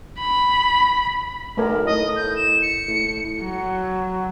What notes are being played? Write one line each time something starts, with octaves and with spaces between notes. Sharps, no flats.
B5
B1 A3 A#4
A2 D#5
G6
E7
C#7
A2
F#3